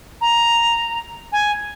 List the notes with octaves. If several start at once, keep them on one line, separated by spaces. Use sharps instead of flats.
A#5
G#5